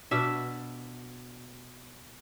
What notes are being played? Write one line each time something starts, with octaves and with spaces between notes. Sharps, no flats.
B2 D4 E5